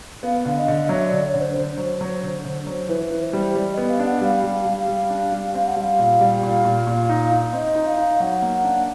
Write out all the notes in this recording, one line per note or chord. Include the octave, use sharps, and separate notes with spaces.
B3 F5
D3
D#5
D3
F#3 E5
D5
D3
C#5
D3
C5
D3 C5
F#3
F#3
D3
D3
F#3
E3 B4
E3
C5
G3
G3 D5
D#5
B3
F5
D4
F#5
G3 F5
G3
G3
G3
D4
G3
C4 F5
F#5
G3 F5
A#2
G3
A#2
A#2
A#2
D#4
D#4
C4 D#5
D#4
F5
D#4
F#3 F#5
A#3
D4